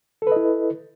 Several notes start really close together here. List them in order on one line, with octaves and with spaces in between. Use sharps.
A4 B4 D#5 E4